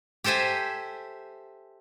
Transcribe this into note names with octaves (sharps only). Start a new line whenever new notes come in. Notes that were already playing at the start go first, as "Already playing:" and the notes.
G4 A4 C5 E5 G#5